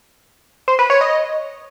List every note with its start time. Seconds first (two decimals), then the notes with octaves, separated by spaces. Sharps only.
0.68 C5
0.79 B4
0.90 C#5
1.01 D#5